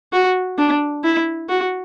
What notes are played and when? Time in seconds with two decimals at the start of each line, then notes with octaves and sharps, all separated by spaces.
0.13 F#4
0.58 D4
1.04 E4
1.49 F#4